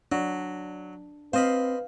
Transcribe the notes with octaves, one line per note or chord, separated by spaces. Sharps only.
F#3 D4
C4 B4 C5 D#5 F5 B5